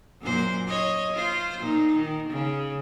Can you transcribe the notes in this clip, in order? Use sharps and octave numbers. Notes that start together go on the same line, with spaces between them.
F#2 A#2 C5
C#5 D#5
F4 C5
A#2 D#4
D#3
C#3